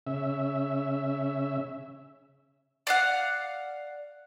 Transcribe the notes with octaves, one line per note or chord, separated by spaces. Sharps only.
C#3 E5
D5 F5 F#5